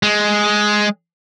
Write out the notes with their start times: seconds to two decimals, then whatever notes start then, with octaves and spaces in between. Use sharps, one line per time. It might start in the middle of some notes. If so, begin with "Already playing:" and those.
0.03 G#3